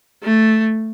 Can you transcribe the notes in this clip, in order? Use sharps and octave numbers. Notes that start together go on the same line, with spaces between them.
A3